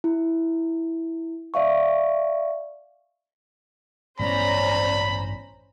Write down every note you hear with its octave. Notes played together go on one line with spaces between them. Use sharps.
E4
D5 E5 F5 C#6
A1 G2 B3 C#4 C5 D5 A#5 B5